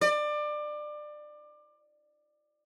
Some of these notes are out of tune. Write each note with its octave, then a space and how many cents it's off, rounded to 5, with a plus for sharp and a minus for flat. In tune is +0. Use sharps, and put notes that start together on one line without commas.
D5 +25